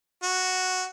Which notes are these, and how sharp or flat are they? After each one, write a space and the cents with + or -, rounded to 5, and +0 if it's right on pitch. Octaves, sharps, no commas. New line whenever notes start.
F#4 +0